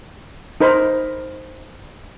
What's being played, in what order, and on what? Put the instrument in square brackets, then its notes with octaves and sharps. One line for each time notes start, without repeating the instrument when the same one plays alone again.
[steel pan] D#4 A#4 C5 B5